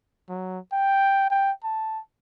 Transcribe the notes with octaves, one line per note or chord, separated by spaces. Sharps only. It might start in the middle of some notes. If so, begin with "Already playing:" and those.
F#3
G5
G5
A5